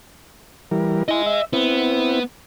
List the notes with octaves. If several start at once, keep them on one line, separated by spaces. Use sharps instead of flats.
E3 G3 A#4
E4 D#5 G#5
E5
B3 C4 E4